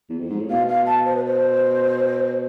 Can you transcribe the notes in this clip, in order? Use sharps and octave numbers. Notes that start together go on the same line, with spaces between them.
E2
F2
G#2
A2
B2 F5
F5
A5
C5
B4
C5